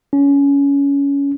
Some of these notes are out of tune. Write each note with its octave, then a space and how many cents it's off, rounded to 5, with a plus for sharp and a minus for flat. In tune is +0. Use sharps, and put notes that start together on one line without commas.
C#4 +20